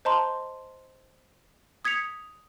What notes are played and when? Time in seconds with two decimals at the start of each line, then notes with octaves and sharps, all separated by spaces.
0.05 C5 D#5 A5 A#5 C6
1.85 D#6 G#6 B6 C#7 F7